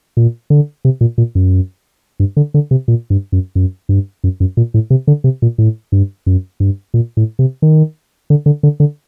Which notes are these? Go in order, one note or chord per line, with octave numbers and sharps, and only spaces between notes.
A#2
D3
C3
A#2
A#2
F#2
G2
D3
D3
C3
A#2
G2
F#2
F#2
G2
F#2
F#2
A#2
A2
C3
D3
C3
A#2
A2
G2
F#2
G2
A#2
A2
C3
D#3
D3
D3
D3
D3